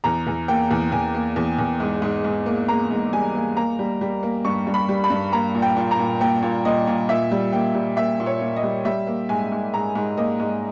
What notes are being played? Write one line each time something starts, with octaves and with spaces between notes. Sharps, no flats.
E2 A#5
E2
A#3 G5
E2
E2 G#5
A#3
E2
E2
G#2
G#2
G#2
A#3
A#3 A#5
G#2
G3 G#5
A#3
A#3 A#5
G3
G3
A#3
G2 C#6
G2
B5
G3
B5
G2
A#3 A#5
A#2
G5
A#2
A#5
A#2
A#3 G5
A#2
A#2 D#5
A#2
A#2 E5
G3
A#3 G5
G3
A#3 E5
A#2
C#5
A#2
D#5
G3
G3 E5
A#3
G#2 G#5
G#2
G#2 A#5
G#2
A#3 D#5
G#2